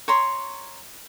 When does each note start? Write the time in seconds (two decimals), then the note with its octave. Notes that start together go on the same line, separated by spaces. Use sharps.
0.08 C#5 A#5 C6